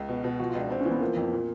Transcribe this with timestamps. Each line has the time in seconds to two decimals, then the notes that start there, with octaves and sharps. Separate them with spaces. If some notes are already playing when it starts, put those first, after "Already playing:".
Already playing: C#2
0.09 B2
0.24 B2
0.39 F3 F#4
0.50 F4
0.55 C#2 D4
0.70 C4 D4
0.81 C#4
0.85 E3
0.91 B3
1.01 F3 A#3
1.16 F2
1.32 A#2